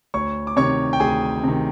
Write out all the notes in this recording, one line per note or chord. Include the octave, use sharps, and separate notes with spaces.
D2 C#5 C#6
D6
C3 D#3 C#5 C#6
G5
D2 G#4 G#5
C3 D#3